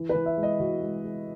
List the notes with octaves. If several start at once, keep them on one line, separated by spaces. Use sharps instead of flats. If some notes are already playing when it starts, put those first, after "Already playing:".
Already playing: E3
B4
E3
E5
G#3
D#5
E3 F#4
G#3
G#3